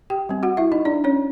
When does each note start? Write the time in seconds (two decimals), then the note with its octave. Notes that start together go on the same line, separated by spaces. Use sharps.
0.10 G4 G5
0.29 G3 C4
0.43 F#4 F#5
0.57 E4 E5
0.72 D#4 D#5
0.85 D4 D5
1.04 C#4 C#5